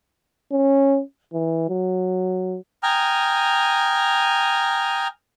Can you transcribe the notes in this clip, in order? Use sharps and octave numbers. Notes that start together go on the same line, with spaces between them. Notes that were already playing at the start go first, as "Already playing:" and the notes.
C#4
E3
F#3
G5 G#5 A#5 D#6 F6